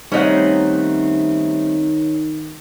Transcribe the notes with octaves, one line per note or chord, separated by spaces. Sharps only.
D#3 G3 A3 C4 C#4 D#4 F#5